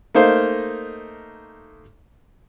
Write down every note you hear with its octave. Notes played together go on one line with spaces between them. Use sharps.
A3 A#3 D#4 C5 F5